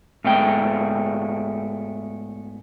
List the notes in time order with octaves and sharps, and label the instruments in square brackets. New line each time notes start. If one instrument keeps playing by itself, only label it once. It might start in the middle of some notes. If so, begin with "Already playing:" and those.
[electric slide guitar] G#2 A3 B3 G5